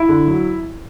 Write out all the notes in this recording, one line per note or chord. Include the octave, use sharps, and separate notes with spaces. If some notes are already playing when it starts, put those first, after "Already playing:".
Already playing: E4
D3
F#3